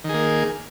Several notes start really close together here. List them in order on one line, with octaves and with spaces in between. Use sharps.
D#3 G#4 A#3